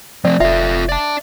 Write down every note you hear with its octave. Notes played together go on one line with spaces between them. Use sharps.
F3 A3 C4 D5
F1 F4 A4 E5
D5 A5